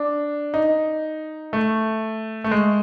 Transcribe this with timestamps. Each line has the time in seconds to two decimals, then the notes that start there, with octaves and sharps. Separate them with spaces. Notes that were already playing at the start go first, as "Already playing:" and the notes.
Already playing: D4
0.54 D#4
1.53 A3
2.44 A3
2.51 G#3